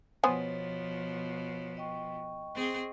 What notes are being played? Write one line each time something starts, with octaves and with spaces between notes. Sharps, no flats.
B2 F3 B3 C5 C#5 G#5
D#5 G5 C#6
C4 G#4